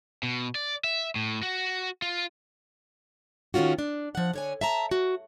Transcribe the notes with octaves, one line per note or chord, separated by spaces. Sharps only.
B2
D5
E5
A2
F#4
F4
D#3 A3 C#4 F4 F#4
D4
F3 F#5
D3 C#5 G#5
E5 A5 A#5
F#4